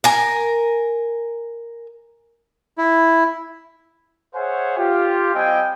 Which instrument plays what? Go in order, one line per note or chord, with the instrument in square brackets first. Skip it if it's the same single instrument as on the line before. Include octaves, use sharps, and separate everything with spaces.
[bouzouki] A#4 G#5
[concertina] E4
[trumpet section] G#4 C5 C#5 E5 F#5 G#5
F4 G4
G3 C4 D#5 F5 G5 G#5